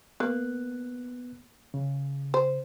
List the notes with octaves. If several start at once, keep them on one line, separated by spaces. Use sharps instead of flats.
A#3 B3 F#6
C#3
C5